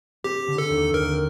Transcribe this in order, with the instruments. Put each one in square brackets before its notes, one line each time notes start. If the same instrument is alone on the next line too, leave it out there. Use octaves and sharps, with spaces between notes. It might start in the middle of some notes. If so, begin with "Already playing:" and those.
[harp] C4 [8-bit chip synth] G4
[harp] D3
[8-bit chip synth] A4
[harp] D#2
[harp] D#2 [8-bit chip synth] A#4